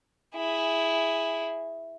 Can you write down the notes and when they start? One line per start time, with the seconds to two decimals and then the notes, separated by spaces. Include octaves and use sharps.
0.35 E4 G#4